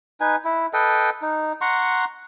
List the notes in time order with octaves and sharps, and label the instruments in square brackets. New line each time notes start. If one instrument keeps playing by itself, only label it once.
[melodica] D#4 B4 G#5
E4
A4 B4 D#5 G5
D#4
F#5 A#5 C6 C#6